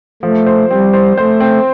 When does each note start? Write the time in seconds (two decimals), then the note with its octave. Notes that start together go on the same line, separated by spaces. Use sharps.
0.22 F3 A3
0.46 C5
0.70 G3 C4
0.93 C5
1.17 A3 C5
1.40 C4